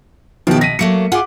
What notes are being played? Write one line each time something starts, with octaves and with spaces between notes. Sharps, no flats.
B2 D#3 F3 E4 G4
B2 A#6 B6 D#7
F#3 A3 A#3 C#7
F4 G#4 F#5 D6